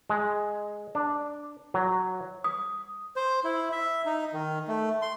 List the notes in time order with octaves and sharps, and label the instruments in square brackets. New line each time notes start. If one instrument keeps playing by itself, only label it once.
[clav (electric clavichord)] G#3
D4
F#3
[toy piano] D#6
[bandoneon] C5
E4
E5
D#4
D#3
A3
C6